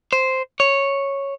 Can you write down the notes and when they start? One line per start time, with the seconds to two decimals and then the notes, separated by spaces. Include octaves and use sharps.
0.13 C5
0.60 C#5